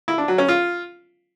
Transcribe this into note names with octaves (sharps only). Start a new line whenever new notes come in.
E4
D4
F#3
C#4
F4